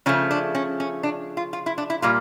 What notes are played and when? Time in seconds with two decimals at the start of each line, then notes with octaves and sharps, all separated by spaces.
0.06 C#3 F3 A3 C#4
0.31 D4
0.55 C#4
0.80 C#4
1.03 D4
1.37 F4
1.53 F4
1.66 E4
1.78 D4
1.90 E4
2.02 A#2 G3 A#3 F4